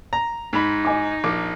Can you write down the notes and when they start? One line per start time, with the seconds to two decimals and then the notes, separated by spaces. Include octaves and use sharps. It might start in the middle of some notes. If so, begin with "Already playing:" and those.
0.13 A#5
0.53 G#2 D#4 B5
0.85 D#5 G#5 D6
1.24 A#1 D6